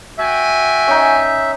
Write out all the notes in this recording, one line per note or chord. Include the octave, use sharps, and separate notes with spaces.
F#4 E5 G5 G#5
C#4 D#4